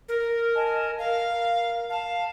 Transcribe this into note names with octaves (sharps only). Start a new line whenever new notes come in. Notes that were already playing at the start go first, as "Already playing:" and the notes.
A#4
D#5 G#5 A5
A#4 F5
F5 A5